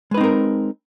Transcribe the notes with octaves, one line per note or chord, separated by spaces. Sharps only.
G#3 C4 D#4 A#4 B4